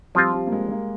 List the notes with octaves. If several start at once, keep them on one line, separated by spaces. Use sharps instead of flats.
F3 G3 C4 F4
G3
A#3
G#3
A#3